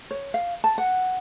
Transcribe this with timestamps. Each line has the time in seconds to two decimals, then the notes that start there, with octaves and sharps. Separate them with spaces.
0.11 C#5
0.34 F5
0.64 A5
0.78 F#5